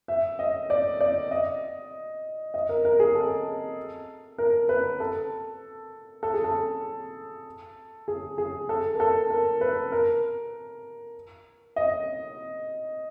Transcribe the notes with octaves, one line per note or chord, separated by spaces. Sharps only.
E5
D#5
D5
D5
D#5
D#5
A#4
A#4
G#4
A4
A#4
B4
A4
A4
G#4
A4
G#4
G#4
A4
A#4
A4
A#4
B4
A#4
D#5